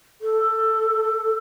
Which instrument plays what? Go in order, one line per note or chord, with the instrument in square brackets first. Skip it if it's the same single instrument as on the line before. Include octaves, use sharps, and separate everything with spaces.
[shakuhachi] A4